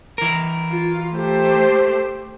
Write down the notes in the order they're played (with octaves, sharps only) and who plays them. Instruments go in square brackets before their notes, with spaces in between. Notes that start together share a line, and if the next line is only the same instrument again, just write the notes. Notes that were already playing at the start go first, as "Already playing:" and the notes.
[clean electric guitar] E3 A#4
[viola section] F4
A3 G4 C5